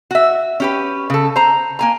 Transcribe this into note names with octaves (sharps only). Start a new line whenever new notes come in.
F#4 E5
C#4 G4 B4
C#3 A4
C5 A#5
A#3 G#5 A#5